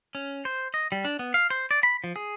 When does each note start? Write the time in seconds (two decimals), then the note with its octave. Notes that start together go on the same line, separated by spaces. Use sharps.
0.15 C#4
0.45 C5
0.74 D#5
0.92 G3
1.05 D4
1.19 B3
1.34 F5
1.50 C5
1.71 D5
1.83 B5
2.04 F3
2.16 G#4